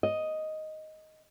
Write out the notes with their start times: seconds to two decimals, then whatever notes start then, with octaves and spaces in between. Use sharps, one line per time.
0.03 D#5